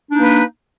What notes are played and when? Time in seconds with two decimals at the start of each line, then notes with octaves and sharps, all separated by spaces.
0.09 D4
0.12 D#4
0.15 A#3
0.18 B4